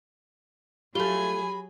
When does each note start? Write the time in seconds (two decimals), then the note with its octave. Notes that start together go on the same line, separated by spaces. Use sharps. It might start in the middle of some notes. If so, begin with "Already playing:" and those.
0.95 F#3 A3 F4 G4 G#4 G#5 B5 G7